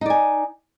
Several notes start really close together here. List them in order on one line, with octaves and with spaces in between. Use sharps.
D#4 D5 G#5